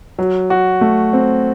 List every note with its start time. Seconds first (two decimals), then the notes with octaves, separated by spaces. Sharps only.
0.19 F#3
0.50 F#4
0.81 A3
1.13 C4